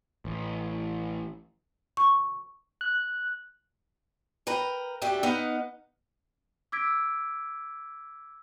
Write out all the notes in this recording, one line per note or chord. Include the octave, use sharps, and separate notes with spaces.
A1
C#6
F#6
A#4 B4 G5 A#5
D2 G3 D4 E5 G5
B3 D#4 F5 F#5
D6 E6 G#6 B6 D7